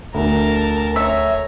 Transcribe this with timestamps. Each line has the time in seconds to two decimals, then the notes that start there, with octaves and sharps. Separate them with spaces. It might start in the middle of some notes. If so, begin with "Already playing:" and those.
0.14 D2 A#4 A5
0.96 C#5 E5 A#5